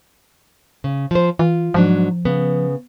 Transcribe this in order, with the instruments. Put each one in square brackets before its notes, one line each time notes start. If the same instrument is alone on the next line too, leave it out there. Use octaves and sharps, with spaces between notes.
[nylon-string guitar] C#3
F3 C5
[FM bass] E3 [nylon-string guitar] F4
[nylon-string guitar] G#2 F#3 D4 [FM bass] F3
[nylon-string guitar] C#3 B3